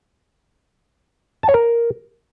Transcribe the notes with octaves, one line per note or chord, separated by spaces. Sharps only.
A5
C#5
A#4